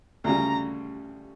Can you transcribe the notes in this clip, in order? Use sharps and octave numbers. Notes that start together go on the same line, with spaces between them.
D2 C#3 G3 A#5